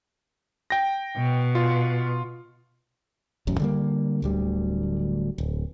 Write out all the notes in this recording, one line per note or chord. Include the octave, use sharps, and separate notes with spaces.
G5 A#6
B2
F4
D#1 A1 F#2
D3 G3 A#3
D1 D2 G3
D1